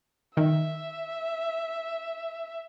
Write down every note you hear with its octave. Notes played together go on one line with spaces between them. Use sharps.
D#3 E5